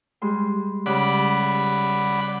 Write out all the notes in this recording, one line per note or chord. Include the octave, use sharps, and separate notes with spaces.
G3 G#3 C6
C#3 G3 D5 F#5 B5